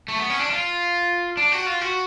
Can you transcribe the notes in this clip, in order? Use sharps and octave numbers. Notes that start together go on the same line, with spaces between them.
A3
B3
C#4
D4
F4
D4
F#4
F4
F#4